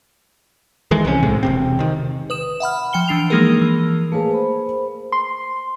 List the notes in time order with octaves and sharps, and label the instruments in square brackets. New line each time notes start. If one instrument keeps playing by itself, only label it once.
[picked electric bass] D#3 E3 G#3
C2 C3 D#3 C#4
B1 A2 C3 G#3
E1 C3 C4
C3 D#3
[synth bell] B4 D#6 E7
E5 F#5 B5 F6
F3 G5 C#7 G7
E3 D4 C7 F7
F3 G#3 A#3 D#4 G#4 A#4
E3
[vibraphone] A3 B4 C#5 [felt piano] A#3 G#4
[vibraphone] C5 B5
[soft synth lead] C6